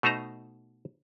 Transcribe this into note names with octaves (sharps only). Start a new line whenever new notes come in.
B2 A3 D#4 C5 A#5